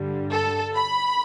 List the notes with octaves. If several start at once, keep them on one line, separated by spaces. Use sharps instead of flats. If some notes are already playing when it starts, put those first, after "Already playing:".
Already playing: G2 D3 G3
A4
B5